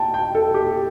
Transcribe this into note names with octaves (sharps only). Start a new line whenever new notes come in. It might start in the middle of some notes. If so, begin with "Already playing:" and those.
Already playing: G5 A5
G5
A4
G4